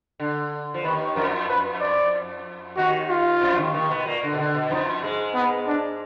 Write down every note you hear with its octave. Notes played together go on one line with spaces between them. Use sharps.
D3
F3
D#2 D#3 B4
F2 F3 A#4
B4
D5
D#2 D#3 F#4
F4
F2 F3
D#2 D#3
D#2 D#3
B2 B3
A#2 A#3
D3
B2
D3
B2
F2 F3 D#4
G#2 G#3
B3
D4